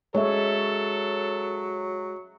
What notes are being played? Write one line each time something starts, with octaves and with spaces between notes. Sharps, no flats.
F#3 G#3 A4 C#5 E5